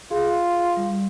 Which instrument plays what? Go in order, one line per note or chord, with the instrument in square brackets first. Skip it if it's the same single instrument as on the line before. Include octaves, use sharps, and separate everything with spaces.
[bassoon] F4 [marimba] G#4
[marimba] G3